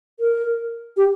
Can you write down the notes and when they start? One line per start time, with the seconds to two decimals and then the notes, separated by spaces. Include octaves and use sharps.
0.20 A#4
0.97 G4